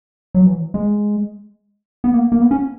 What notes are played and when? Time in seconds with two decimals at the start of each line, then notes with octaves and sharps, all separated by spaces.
0.35 F#3
0.46 E3
0.74 G#3
2.04 B3
2.14 A#3
2.32 A#3
2.41 B3
2.51 C#4